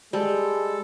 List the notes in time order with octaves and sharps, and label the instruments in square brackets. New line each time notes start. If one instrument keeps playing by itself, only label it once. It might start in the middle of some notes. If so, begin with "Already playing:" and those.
[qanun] G3 [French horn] G#3 [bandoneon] A4